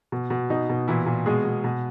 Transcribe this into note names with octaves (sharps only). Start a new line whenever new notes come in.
B2
B2
B2 D#4
B2
A#2 E3 E4
A#2
B2 G#3 G#4
B2
B2